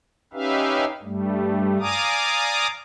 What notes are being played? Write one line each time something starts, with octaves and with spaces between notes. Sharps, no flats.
C#4 D#4 G4 B4 E5 F5
G2 G3 A3
D5 F5 G#5 A#5 D6 D#6